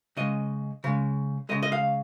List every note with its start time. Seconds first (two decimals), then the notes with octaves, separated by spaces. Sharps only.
0.17 C#3 G#3 D#5
0.84 C#3 G#3
1.49 C#3 G#3 D#5
1.63 D#5
1.72 F5